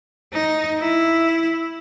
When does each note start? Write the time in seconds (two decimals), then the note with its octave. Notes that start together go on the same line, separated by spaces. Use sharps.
0.33 D#4
0.79 E4